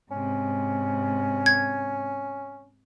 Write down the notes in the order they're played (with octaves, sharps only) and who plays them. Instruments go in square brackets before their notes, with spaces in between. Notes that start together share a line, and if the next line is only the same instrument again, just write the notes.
[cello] G#2 C3 [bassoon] C#4
[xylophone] G#6